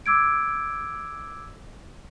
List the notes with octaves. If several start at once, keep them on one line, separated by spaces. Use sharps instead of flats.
D6 E6 G#6 D7